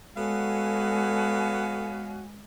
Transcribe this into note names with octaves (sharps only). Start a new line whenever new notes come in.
G#3 B3 F#4 A4 C#5 F5 G#5